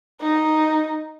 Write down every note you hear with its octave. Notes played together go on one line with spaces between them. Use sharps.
D#4